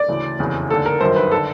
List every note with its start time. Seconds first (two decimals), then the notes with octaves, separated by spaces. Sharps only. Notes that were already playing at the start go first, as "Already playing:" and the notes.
Already playing: D5
0.08 D2 C#3 E3
0.39 F1 E2 C#3 E3
0.69 D#2 D3 A4
0.86 A#4
1.00 G1 F#2 D#3 C5
1.16 B4
1.31 D3 A4